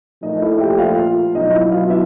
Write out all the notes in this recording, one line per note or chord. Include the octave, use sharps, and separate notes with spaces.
A#2 F3 A3 D#4 D#5
E4 E5
G4 G5
F4 F5
B2 F#3 B3 D#4 D#5
E4 E5
F4 F5
E4 E5